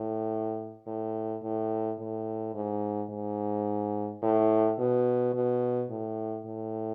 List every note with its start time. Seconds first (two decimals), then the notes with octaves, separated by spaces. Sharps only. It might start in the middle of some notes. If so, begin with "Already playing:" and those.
Already playing: A2
0.87 A2
1.43 A2
1.99 A2
2.54 G#2
3.10 G#2
4.22 A2
4.79 B2
5.34 B2
5.90 A2
6.46 A2